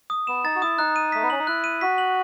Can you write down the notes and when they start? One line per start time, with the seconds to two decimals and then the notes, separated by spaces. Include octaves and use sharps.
0.10 D#6
0.27 B3 E7
0.44 D#4 A6
0.55 F#4
0.62 E4 D#6
0.78 D#4 F#6
0.96 D#7
1.12 A3 B6
1.22 B3
1.30 C#4 F#7
1.39 D#4
1.47 E4 F#6
1.64 D#7
1.81 F#4 B6
1.98 F#7